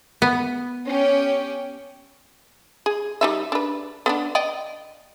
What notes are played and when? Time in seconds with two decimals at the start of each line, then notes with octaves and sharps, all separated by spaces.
0.22 B3
0.87 C#4 G4 G5
2.86 G#4
3.21 G3 D#4 E5
3.52 D4 B4
4.06 B3 C#4 D4
4.35 D5 D#5 G5